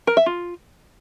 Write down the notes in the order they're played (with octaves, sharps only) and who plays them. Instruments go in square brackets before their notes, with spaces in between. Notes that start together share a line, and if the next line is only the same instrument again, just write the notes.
[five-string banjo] A#4
E5
F4